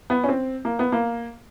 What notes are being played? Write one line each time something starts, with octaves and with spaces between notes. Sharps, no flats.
B3
C#4
C4
A#3
B3
A#3